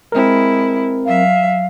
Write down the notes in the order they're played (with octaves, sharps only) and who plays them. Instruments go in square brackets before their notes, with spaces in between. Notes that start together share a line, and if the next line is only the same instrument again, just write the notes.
[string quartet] G#3 E4 [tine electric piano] C4 A#4
[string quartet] F#3 E5 [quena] F5